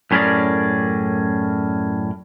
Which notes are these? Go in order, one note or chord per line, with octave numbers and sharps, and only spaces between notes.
F#2 A2 C#4 G#4 A#4 D5